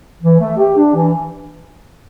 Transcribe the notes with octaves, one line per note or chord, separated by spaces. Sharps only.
E3
A3
G4
D4
E3